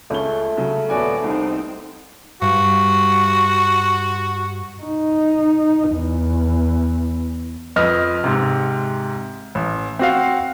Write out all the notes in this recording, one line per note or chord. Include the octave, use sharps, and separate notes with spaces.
C#2 A3 C#4 G7
C#3 F#3
D#1 B3 F#4 D5 G#5
C2 C4 D#4
G2 F#4
D#4
E2
F2 B4 D#5 F6
G#2 C3
A1
C4 F#4 F5